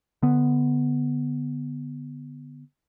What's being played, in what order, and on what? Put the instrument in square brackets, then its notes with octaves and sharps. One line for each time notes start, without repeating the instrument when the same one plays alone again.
[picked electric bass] D3 B3